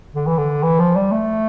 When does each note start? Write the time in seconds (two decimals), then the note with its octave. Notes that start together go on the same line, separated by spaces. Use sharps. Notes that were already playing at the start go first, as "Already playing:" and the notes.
0.15 D3
0.27 E3
0.38 D3
0.63 E3
0.79 F3
0.95 G3
1.12 A3